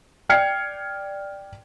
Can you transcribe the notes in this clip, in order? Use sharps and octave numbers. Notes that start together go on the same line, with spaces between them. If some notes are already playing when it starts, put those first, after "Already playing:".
D5 G5 F6 G#6 C7 C#7